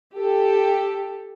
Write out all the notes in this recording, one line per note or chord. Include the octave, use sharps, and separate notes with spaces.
G4 A4